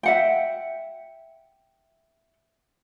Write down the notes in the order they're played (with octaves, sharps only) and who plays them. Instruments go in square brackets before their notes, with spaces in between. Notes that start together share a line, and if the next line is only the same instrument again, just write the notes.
[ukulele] E5 F#5 G5